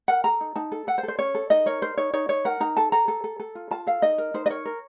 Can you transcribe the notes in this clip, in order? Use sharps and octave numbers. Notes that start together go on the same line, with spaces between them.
A#4 F#5
A4 A#5
D#4
D#4 A5
A4
A4 F#5
C5
A4
C5
C#4 C#5
A4
D#4 D#5
A#4 C#5
A#4 C5
D#4 C#5
D#4 C#5
D#4 C#5
A#4 F#5
D#4 A#5
A4 A5
A4 A#5
A4
A4
A4
F4
F4 A5
A4 F5
D#4 D#5
A#4
D#4 C5
D#5
A#4 C#5
A#4